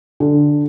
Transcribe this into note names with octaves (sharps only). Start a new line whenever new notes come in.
D3